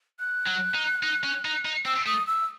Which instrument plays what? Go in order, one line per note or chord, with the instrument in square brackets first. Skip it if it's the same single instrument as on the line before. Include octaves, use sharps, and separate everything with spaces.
[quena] F#6
[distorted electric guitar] F#3
D#4
D#4
C#4
D#4
D#4
[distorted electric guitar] C4 [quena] E6
[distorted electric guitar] A3 [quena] D#6
[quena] E6